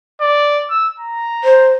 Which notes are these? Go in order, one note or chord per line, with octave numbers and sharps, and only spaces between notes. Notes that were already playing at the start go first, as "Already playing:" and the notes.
D5
E6
A#5
C5